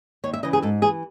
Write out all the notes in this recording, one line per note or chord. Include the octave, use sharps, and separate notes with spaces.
D#2 C#5
E5
C#3 E3 D#5
G#4
G#2 A4
E3 G#4